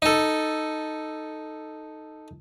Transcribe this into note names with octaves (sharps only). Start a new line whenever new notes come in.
D#4 A4